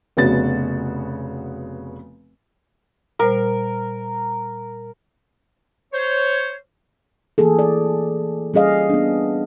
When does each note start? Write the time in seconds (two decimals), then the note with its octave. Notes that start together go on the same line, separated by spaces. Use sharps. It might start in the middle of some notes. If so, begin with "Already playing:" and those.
0.17 F1 C#3 B3 F#4 A6
3.19 A#2 G3 A#4 C5
5.93 C5 C#5
7.38 E3 A#3 G#4 A4
7.59 D5
8.54 G3 C#4 G#4 D#5 F5
8.90 B3 D4